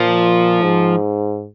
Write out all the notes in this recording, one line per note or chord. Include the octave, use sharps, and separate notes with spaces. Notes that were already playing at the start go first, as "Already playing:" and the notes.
Already playing: A#2 F3
G#2